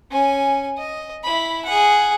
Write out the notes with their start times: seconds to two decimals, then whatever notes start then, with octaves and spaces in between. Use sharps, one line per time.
0.11 C#4 G#5
0.77 D#5
1.24 E4 B5
1.65 G#4 F#5